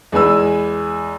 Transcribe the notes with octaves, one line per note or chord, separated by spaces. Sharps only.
E2 G#3 B4 G#5 E6